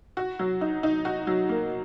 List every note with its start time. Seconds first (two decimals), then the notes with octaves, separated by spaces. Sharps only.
0.17 F#4
0.39 F#3
0.61 D#4
0.83 D#4
1.05 F#4
1.27 F#3
1.49 A#3